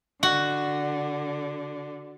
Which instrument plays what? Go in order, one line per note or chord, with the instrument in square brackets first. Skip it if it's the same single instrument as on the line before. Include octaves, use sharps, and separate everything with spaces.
[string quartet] D3 [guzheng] F#4